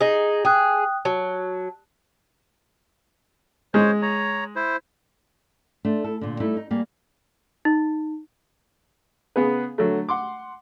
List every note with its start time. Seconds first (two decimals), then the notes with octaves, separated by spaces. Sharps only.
0.01 D#4 G#4
0.45 G#4 G5 D#6 F#6
1.05 F#3 A5
3.74 G#3 C5 C#5
4.02 C#5 A#5
4.56 E4 C5
5.85 A3 D4 C5
6.04 E4 A4
6.21 A#2 D3
6.40 G3 A3 D#4 E4 A4
6.57 D#4
6.71 G3 A#3 G#4
7.65 D#4
9.36 C#3 B3 G#4 B4
9.78 D3 F#3 A3
10.09 F#5 C6 D6